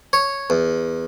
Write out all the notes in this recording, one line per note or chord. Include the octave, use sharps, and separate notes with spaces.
C#5
E2